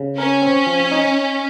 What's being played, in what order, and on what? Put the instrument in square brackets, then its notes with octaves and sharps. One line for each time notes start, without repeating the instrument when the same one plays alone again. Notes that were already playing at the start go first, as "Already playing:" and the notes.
Already playing: [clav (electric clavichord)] C#3
[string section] C#4 [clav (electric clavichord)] A#4
[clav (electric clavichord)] C4
F3
D#4